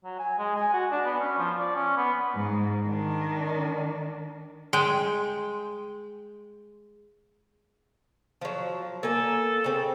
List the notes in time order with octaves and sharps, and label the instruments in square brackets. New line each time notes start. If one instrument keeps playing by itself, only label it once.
[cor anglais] F#3
G#5
G#3
G#5
F#4
D4
B3
C#4
F3
D5
C#4
B3
[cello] G#2
D#3 D4
[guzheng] G#3 G5
[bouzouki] F3 F#3
[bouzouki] A#3 G#5 [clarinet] A4
[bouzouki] C#3 C4